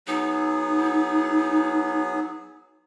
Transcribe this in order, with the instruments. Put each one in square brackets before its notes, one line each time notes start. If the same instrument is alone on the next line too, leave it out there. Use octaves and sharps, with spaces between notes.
[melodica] F#3 B3 G#4 [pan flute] D#4